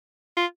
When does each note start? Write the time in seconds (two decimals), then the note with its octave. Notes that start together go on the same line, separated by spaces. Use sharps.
0.36 F4